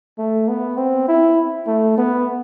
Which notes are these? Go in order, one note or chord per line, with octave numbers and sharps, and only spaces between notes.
A3
B3
C4
E4
A3
B3